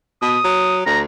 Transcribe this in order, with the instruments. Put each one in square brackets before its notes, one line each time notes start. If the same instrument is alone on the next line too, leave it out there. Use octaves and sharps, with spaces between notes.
[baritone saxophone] B2 [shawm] D#6
[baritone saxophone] F#3
[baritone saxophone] D2 [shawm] A#5